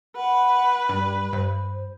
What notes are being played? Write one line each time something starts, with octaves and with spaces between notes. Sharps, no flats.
B4 F#5
G2 G3
G2 C5